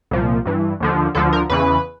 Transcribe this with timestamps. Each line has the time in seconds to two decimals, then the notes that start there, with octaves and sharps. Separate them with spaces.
0.11 C2 A#2 F3
0.45 G2 E3
0.80 D#2 D3 F3
1.15 D2 D3 F3 A4
1.33 A#4
1.50 E2 C#3 E3 B4